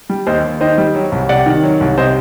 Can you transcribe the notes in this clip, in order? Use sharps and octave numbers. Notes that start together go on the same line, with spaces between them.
G3
D#2 C5 D#5
D#2
D#3 C5 D#5
G3
F#3
C2
C3 D5 F#5
D#3
F#3
C2
C3 C5 D#5